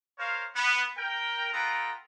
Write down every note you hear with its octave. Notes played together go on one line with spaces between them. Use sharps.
A#4 C5 C#5 F5
B3
A#4 G5
B3 F4 A4 B4 G5 A#5